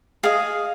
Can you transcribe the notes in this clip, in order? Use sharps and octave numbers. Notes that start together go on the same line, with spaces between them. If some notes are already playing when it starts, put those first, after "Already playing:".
G#4 D#5 F5